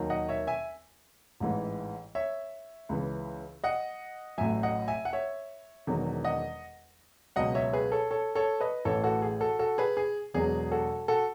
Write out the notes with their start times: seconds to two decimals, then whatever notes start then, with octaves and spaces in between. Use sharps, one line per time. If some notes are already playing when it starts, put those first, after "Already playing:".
Already playing: D#2 D#3 F#3
0.10 D#5 F#5
0.29 C#5 E5
0.47 E5 G#5
1.40 A1 G#2 E3
2.15 C#5 E5
2.89 C#2 C#3 E3
3.64 D#5 F#5
4.38 A1 A2 F#3 E5 G#5
4.63 D#5 F#5
4.88 E5 G#5
5.05 F#5
5.13 C#5 E5
5.87 E1 E2 D#3 F#3
6.25 D#5 F#5
7.36 C#2 B2 F#3 D#5 F#5
7.55 C#5 E5
7.73 G#4 B4
7.92 A4 C#5
8.11 A4 C#5
8.35 A4 C#5
8.60 B4 D#5
8.85 A1 A2 E3 A4 C#5
9.03 F#4 A4
9.22 G#4
9.41 F#4 A4
9.59 F#4 A4
9.78 G#4 B4
9.97 G#4
10.34 E1 E2 B2 F#3 G#4
10.72 F#4 A4
11.08 F#4 A4